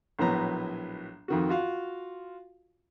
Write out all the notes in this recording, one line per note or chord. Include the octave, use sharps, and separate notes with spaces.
A#1 A2 F#3 B3 A#5
F2 D#3 F#4
F4 F#4 F5